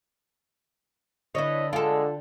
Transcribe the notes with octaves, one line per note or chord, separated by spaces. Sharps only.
D3 E4 A4 B4 C#5 D#5
D3 G#3 F4 A4 G5